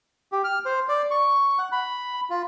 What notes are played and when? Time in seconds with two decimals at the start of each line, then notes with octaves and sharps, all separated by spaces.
0.32 G4
0.44 F6
0.66 C5
0.89 D5
1.11 C#6
1.58 F#5
1.72 B5
2.30 F4